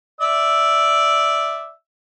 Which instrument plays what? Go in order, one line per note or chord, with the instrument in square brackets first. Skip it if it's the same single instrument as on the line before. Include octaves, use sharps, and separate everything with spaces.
[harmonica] D5 E5 E6